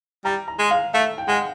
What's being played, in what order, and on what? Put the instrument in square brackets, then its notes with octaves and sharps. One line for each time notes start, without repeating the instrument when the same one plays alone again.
[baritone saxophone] G3 [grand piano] A#5
[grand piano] A#5
[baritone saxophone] G#3
[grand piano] F5
[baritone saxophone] A3 [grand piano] F5
[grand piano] G5
[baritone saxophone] G#3 [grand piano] F#5